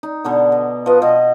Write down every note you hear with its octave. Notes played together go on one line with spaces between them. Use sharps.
D#4
B2 D3 B3
D#5
F3 B4 D#5
B2 D#5